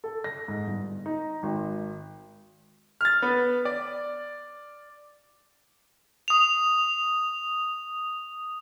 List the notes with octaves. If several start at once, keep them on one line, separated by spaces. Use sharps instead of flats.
A4
A#6
G#2
G1
D#4
G#1
F6 A6
B3
D5
D#6 F7